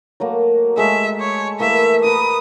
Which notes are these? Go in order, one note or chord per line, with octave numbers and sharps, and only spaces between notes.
F#3 A3 A#3
G#3 A3 E5
C#5
E3 A3 A#3 E5
A#4 B4 D#6